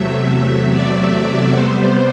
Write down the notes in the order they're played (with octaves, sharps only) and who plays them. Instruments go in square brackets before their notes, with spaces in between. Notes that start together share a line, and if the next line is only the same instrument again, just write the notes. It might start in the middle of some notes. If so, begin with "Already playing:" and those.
Already playing: [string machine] E2 C3 F#3 A3 E5
D5
C3 G3 B3 C5